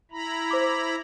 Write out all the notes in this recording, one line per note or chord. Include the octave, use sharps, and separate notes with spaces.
E4 A#5 B5
C5 D6